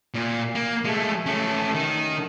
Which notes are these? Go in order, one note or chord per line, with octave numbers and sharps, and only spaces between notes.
A#2
A#3
G#3 A3
A3 C#4
D#3